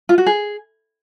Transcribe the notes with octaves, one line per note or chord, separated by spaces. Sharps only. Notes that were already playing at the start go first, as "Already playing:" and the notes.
F4
F#4
G#4